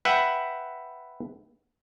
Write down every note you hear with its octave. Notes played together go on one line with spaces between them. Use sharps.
B4 E5 F#5 G5